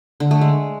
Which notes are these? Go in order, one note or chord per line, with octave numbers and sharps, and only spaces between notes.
D3
A3
G#3